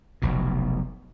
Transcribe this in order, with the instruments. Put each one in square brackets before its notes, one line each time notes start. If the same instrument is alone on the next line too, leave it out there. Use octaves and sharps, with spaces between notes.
[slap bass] F1 B1 B2